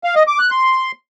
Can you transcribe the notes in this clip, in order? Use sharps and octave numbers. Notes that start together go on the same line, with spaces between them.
F5
D#5
D6
F#6
C6